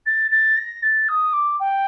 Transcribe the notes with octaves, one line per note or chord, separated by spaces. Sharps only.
A6
A6
A#6
A6
D#6
D6
G5